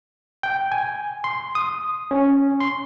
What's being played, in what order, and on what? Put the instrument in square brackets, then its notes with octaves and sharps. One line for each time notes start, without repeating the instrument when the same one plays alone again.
[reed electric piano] G5
G#5
C6
D#6
C#4
C6